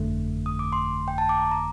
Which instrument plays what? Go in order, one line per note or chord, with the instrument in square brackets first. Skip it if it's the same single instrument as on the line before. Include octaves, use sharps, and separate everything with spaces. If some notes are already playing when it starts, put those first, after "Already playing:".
Already playing: [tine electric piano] G1 F2 D3 A3
[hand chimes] D#6
D6
C6
G5
A5
D6
A#5
A#5